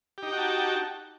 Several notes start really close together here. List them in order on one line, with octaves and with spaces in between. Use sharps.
G4 D#4 G5 F#4 A5